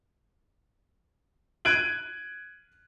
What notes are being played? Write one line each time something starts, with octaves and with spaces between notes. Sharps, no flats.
F#6 G#6 D7 D#7 F#7